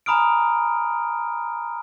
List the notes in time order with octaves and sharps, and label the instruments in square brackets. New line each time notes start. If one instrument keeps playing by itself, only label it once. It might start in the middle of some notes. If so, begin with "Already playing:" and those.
[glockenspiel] G#5 A#5 B5 D#6 F6 D7